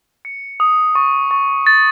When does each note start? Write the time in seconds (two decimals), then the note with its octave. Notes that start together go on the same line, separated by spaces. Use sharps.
0.25 C#7
0.60 D#6
0.95 C#6
1.31 C#6
1.67 A6